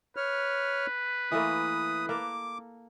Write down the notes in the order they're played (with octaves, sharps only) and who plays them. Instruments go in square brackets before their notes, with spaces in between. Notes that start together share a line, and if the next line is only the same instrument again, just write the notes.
[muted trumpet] B4 [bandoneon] C#5 F6
[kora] E3 A3 A#3 [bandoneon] D#6
[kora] A#3 A4 [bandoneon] D6